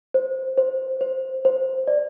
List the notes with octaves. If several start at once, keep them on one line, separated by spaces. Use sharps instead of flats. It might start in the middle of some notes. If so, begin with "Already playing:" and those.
C5
C5
C5
C5
D5